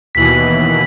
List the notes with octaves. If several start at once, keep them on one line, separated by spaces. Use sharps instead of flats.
D#2 B2 E3 B6 F#7